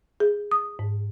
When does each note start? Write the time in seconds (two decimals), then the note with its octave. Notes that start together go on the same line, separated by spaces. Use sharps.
0.20 G#4
0.51 D#6
0.79 G#2